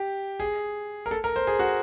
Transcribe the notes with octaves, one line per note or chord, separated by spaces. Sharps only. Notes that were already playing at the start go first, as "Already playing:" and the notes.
Already playing: G4
G#4
A#4
A4
A#4
C5
G#4
F#4